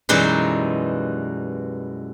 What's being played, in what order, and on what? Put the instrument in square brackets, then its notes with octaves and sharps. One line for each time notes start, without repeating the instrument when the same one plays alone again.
[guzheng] F#2 B2 E3 G3 G#3 D#4